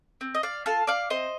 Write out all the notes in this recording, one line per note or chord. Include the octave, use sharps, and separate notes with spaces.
C4
D#5
D5 F5
F4 A4 F5 A5
D5 F5
C4 C5 D#5